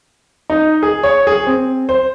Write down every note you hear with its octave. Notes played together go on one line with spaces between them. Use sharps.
D#4
G#4
C#5
G#4
C4
C5